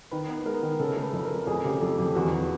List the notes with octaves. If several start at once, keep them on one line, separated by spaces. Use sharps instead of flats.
D#3 B4
B3
G#3 A#4
D#3
C#3 A4
A3
B4
F2
A#4
A3
F2 G#4
C#3 G4
F2 A4
F2 G4
E2 F#4
E2